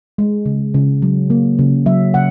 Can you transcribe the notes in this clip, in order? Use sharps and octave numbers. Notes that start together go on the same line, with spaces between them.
G#3
C#3
C#3
F#3
A#3
C#3
F#3 E5
C#3 F#5